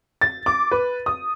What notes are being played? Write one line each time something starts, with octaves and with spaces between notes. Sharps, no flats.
A6
D6
B4
D#6